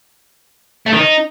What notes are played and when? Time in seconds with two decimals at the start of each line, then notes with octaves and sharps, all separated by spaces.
0.86 A3
0.93 D#3
0.99 D#4